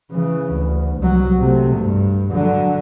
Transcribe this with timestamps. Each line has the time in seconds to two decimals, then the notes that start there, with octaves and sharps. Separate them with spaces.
0.11 C#3 E3
0.53 D2
0.98 C2 F#3
1.40 C3 A3
1.77 G2
2.31 D3 F#3